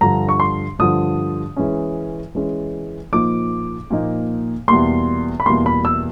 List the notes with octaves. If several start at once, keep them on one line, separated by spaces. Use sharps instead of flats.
G2 D3 F3 A#5
C#6
C6
G2 D3 F3 D#6
E3 G#3 C#4
E3 G#3 C#4
A#2 F3 A#3 D#4 D6
A#2 F3 A#3 D#4
E2 B2 G3 A#3 C6
B5
E2 B2 G3 A#3 C6
B5
E6